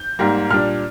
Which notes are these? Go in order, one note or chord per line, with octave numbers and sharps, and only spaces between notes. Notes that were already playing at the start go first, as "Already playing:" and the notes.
Already playing: G6
G#2 G3 A#3
A#2 G3 D4 F6